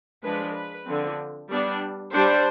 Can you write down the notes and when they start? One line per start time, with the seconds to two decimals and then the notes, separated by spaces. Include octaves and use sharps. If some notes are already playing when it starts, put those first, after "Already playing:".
0.22 F3 G#3 D4 B4
0.55 B4
0.86 D3 F3 C4
1.49 G3 B3 D4
2.13 G3 D4 C5